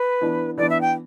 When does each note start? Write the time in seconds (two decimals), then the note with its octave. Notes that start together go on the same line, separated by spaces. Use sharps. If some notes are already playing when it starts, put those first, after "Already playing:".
Already playing: B4
0.21 E3 B3 D4
0.58 E3 B3 D4 D5
0.70 E5
0.81 G5